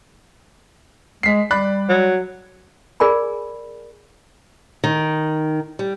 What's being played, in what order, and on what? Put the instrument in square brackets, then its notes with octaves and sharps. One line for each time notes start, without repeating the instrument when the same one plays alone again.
[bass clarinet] G#3 [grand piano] B6 C7
[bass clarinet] G3 [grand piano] D5 B5 F#6
[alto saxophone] F#3
[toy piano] G#4 A#4 D5 G#5 B5
[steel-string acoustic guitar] D#3
G3